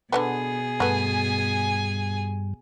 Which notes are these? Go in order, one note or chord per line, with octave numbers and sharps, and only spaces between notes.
B2 D3 A#3 B3 G#4
G2 A3 B3 G#5